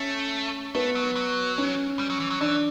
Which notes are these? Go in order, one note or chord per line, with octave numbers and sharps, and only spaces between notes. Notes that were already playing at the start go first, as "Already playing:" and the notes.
Already playing: A3 C#4
A3 B3
F#3
F#3
C#4
G3
F#3
E3
F#3
E3 D4